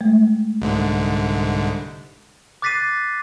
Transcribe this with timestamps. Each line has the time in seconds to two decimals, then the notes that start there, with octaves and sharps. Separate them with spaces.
0.01 G#3 A3
0.62 C2 G#2 D3
2.62 D6 F#6 A6 B6 C7 D#7